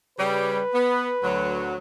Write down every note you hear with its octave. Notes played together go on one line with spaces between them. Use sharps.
C#3 G3 B4
B3
D2 F#3